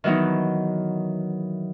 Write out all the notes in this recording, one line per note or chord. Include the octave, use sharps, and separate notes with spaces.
D#3 E3 F#3 B3 D#4